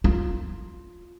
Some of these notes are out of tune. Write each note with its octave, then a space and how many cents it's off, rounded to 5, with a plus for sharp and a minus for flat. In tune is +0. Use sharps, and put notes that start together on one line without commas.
F4 +5